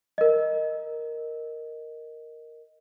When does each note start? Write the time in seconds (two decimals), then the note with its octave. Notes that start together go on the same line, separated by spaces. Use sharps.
0.18 A#4 D#5